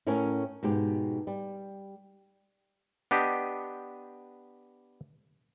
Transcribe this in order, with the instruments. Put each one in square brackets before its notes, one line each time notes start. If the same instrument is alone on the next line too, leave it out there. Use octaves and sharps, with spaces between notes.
[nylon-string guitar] A2 C#4 E4 A#4 C#5 G#5
G#2 B2 G4
G3
[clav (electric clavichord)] B3 D4 G4 D#5